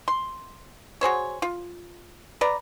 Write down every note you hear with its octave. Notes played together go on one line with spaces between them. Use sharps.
C6
F#4 G#4 C5 C#5
F4
B4 D5 A#5